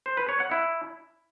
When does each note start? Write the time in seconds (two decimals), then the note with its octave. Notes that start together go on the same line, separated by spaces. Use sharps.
0.06 C5
0.17 B4
0.29 C#5
0.40 F#5
0.51 E4